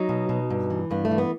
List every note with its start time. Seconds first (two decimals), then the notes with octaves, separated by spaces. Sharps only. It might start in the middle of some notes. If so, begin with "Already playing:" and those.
Already playing: F#3 D#4
0.09 B2
0.29 B2
0.50 G2
0.70 E3
0.91 G2 B3
1.05 A3
1.11 E3
1.18 B3